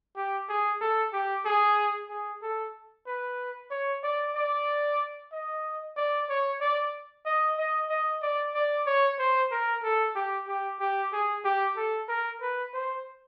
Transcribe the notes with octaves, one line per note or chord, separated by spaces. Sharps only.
G4
G#4
A4
G4
G#4
G#4
A4
B4
C#5
D5
D5
D#5
D5
C#5
D5
D#5
D#5
D#5
D5
D5
C#5
C5
A#4
A4
G4
G4
G4
G#4
G4
A4
A#4
B4
C5